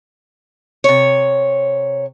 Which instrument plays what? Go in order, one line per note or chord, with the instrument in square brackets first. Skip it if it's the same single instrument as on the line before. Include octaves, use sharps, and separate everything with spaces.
[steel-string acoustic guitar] C3 C#5